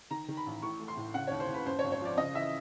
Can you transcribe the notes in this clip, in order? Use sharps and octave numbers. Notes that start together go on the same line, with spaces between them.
D#3 A#5
D#3
B5
A1
A2 C#6
A3
C6
A2
C#3 F#5
D#2 C#5
C5
D#2
B4
F#2 C5
C#5
G#1
C#5
F3 D5
C#3 D#5
E3 E5